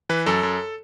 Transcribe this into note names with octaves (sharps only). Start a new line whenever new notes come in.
E3 B4
F#2 A4
F#2